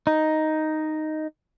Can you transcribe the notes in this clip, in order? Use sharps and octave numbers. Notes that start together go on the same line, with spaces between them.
D#4